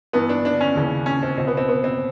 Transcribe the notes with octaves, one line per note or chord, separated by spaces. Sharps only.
G2 E3 B3
D4
D4
C#4
D#2 C#3 E3
C#4
C4
C#2 B2 C4
B3
C4
B3
C4